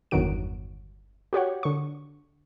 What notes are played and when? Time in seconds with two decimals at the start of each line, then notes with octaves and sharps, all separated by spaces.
0.11 G1 E2 D#3 F#3 F#4 D7
1.33 F#4 G4 C#5 F#5
1.63 D3 C#6